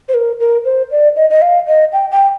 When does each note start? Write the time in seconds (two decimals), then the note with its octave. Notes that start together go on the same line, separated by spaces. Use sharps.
0.08 C5
0.14 A#4
0.40 A#4
0.65 C5
0.91 D5
1.16 D#5
1.30 D#5
1.42 F5
1.67 D#5
1.93 G5
2.11 G5